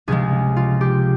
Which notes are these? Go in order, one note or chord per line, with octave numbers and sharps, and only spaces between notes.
C#2 C3 F3 G#3 G#4
F4
G4